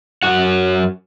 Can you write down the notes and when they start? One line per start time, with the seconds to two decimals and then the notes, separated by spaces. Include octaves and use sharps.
0.23 F#2 F#4 F#5